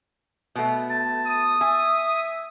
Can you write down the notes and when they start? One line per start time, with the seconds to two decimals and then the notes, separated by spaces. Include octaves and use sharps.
0.55 B2 A3
0.90 A5
1.26 D#6
1.61 E5 G#5